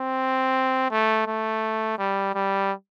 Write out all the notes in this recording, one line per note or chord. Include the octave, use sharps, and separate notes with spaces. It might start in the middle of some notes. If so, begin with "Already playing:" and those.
Already playing: C4
A3
A3
G3
G3